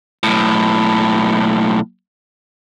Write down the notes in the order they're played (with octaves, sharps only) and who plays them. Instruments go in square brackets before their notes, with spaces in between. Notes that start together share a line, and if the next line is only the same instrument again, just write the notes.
[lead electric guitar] B1 A2